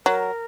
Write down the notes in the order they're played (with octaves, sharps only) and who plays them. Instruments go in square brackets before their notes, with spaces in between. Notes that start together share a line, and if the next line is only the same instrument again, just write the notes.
[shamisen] F#3 [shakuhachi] A#4